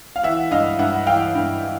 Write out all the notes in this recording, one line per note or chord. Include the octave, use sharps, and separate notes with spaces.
F5
E3 E5 F#5
G2 D#5 F5
G2 E5 F#5
E3 F5 G5
G2
E3